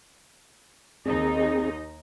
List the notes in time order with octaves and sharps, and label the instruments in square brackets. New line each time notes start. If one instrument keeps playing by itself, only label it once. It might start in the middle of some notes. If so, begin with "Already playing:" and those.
[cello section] D#2 D#4 D#5 [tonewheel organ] C4 G#4